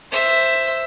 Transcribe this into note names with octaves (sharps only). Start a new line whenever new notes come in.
C5 E5